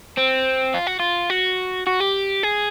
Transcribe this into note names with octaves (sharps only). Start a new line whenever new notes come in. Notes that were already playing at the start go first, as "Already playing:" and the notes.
C4
F4
F#4
F4
F#4
F#4
G4
G#4